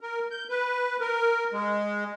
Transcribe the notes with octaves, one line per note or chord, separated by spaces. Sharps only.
A#4
G6
B4
A#4
G#3